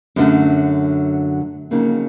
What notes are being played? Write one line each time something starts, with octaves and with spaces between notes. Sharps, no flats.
F#2 D3 F#3 A3
F2 C#3 F#3 A#3 D#4